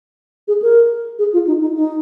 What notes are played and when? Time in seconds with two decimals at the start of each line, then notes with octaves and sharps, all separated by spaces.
0.48 G#4
0.62 A#4
1.19 G#4
1.33 F4
1.47 D#4
1.61 D#4
1.76 D#4